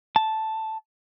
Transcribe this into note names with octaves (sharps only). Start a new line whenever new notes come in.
A5